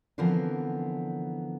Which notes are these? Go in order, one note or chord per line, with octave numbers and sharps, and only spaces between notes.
D3 E3 F3 B3 C4 A#4